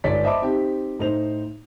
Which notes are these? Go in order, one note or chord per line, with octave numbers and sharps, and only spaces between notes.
G1 G#2 C#5 D5 B6
C5 D#5 E5 A5 B5 D6
C4 D#4 G4
A2 D#4 C5 F7